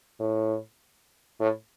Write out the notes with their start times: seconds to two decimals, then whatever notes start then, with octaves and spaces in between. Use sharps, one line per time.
0.20 A2
1.40 A2